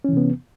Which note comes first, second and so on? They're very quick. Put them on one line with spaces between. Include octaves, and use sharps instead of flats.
C#4 E3 C3 B3